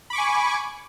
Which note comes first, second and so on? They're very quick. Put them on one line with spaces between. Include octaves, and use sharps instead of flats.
B5 D6 C#6 G#5